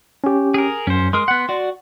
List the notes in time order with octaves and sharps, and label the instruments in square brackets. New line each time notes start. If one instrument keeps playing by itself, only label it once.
[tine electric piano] C#4 G4
[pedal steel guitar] G#4 A#4
[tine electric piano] F#2 [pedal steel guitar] C#4 C5
[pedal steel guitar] G#3 A#4 D#6 [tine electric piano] C6
[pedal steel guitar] B3 F#5
F#4 D5